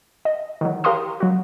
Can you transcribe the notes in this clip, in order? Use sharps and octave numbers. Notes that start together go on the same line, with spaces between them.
D#5
D#3 E3 F#3
G4 A#4 F5 A#5 C6 D#6
F#3 F#4